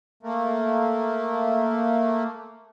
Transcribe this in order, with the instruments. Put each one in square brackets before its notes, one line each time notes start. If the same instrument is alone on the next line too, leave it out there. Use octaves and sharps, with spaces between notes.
[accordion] A3 A#3